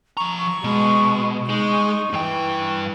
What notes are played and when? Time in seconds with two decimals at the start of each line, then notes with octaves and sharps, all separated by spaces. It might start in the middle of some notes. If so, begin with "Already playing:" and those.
0.17 F3 A#5 C#6
0.64 B2 G#3
1.49 G#3 D#4 C#6
2.13 G2 E3 G5